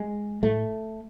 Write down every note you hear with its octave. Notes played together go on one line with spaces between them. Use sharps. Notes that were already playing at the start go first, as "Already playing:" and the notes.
Already playing: G#3
A2 A3